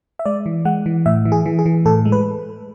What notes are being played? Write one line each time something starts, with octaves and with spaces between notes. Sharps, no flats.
E5
G#3 D5
E3
G#3 F#5
E3
A2 E5
E3
G#4
E3
G#4
E3
A2 A4
G#3
B4